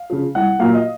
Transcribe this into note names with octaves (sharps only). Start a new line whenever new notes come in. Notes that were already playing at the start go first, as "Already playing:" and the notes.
Already playing: F5
C#3 F3
C2 F#5
A#2 F#3 A#3 F5
D#5